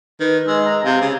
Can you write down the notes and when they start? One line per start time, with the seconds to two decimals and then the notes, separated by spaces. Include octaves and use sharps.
0.20 D#3 B4
0.47 G#3 E6
0.65 A#5
0.84 C3 F5
1.01 C#3